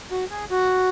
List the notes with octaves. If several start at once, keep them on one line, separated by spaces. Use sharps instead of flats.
F#4
G#4
F#4